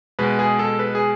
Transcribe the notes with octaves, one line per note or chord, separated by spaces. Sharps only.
B2 G#3 B4
G#4
A4
B4
G#4